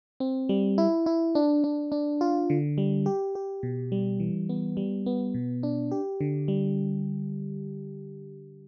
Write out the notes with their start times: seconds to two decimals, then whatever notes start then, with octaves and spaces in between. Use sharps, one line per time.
0.20 C4
0.49 G3
0.78 E4
1.06 E4
1.35 D4
1.64 D4
1.92 D4
2.21 F4
2.50 D3
2.78 G3
3.06 G4
3.35 G4
3.63 B2
3.92 G3
4.20 E3
4.49 B3
4.77 G3
5.06 B3
5.34 B2
5.63 D4
5.92 G4
6.21 D3
6.48 G3